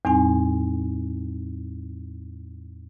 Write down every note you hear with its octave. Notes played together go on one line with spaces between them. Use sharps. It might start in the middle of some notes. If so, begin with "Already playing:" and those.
E2 A2 G3 C4 D#4 G#5